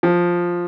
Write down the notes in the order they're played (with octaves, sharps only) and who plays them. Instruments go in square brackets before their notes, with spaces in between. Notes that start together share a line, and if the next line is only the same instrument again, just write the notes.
[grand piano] F3